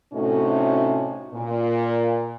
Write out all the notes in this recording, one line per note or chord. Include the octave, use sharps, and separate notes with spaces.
A2 C3 A3 C#4 D#4 F#4
A#2